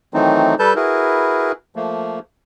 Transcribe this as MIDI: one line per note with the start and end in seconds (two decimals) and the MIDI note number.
0.14 0.55 51
0.14 0.55 52
0.14 0.55 54
0.14 0.55 57
0.14 0.55 60
0.14 0.55 63
0.59 0.74 55
0.59 0.74 69
0.59 0.74 71
0.59 0.74 81
0.59 0.74 91
0.76 1.52 64
0.76 1.52 66
0.76 1.52 68
0.76 1.52 70
0.76 1.52 71
1.76 2.19 53
1.76 2.19 57
1.76 2.19 58